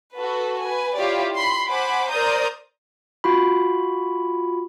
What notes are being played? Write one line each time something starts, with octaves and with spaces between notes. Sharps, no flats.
F#4 A4 B4
B4 G#5
E4 F4 G4 C#5 D5
B5 C6
C5 F#5 G#5 B5 D6
A#4 C5 D5 A#5 D#6 G6
F4 F#4 B5